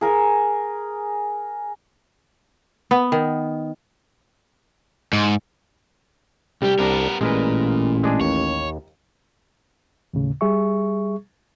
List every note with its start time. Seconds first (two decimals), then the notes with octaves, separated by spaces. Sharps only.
0.01 G#4 A#4 G#5
2.91 B3
3.12 D#3
5.13 G#2
6.62 C2 G3 G4
6.79 C2 B3 D4 A#4 A#5
7.21 A1 A#2 G#3 A#4 B4
8.03 G#3 D4 G#4
8.21 D#2 C#5
10.14 D#2 A2 C#3
10.41 G3 G#4 E5 C#6